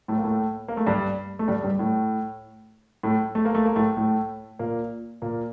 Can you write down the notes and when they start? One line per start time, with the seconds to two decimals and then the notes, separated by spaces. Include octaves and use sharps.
0.08 A2 A3
0.18 A#3
0.24 A2 A3
0.68 A#3
0.77 A3
0.86 G2 G3
1.39 A3
1.48 G2 G3
1.64 G2 G3
1.79 A2 A3
3.03 A2 A3
3.35 A3
3.45 A#3
3.55 A3
3.65 A#3
3.76 A2 A3
3.97 A2 A3
4.59 A#2 A#3
5.22 A#2 A#3